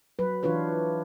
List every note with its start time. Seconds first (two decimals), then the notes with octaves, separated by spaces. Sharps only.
0.19 F#3 B4
0.43 E3 D4 F4 B4 C#5